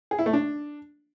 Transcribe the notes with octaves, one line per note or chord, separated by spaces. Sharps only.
G#4
E4
A3
D4